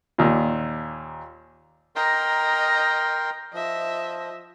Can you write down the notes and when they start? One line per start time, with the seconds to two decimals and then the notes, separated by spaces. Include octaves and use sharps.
0.18 D#2 A#2
1.96 A#4 D#5 G5 A#5 C6
3.53 F3 D#5 E5